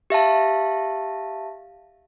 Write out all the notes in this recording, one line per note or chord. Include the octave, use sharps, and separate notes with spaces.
G4 E5 F5 A5